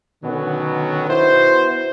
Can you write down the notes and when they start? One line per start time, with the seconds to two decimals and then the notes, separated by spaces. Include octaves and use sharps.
0.24 B2 D3 D#3 F#3 B3 C#4
1.09 B3 E4 F#4 C5